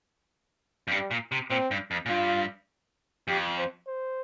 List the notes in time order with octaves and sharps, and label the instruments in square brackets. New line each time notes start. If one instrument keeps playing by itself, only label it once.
[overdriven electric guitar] F2
[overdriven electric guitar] G2 [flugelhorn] G3
[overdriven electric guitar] A#2
C3
[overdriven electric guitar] A#2 [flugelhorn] C4
[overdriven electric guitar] G2
F2
A#2
[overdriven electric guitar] G2 [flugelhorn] F4
[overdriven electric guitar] F2 [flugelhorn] G4
[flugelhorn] C5
C5